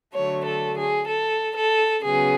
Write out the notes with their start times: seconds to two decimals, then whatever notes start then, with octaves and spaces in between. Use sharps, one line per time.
0.14 D3 F#3 A3 C#5
0.45 A4
0.77 G#4
1.08 A4
1.56 A4
2.03 C#3 F#3 B3 G#4